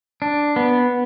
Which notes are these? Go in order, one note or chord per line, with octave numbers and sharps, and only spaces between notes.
D4
B3